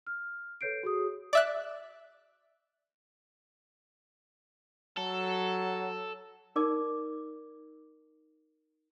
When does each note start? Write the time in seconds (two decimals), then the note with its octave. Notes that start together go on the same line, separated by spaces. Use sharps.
0.07 F6
0.61 A4 B4 C#5 G6 C7 D7
0.83 F#4 G#4 D#6
1.33 D5 E5 F#6
4.97 F#3 A4
6.56 D#4 A#4 D5 D6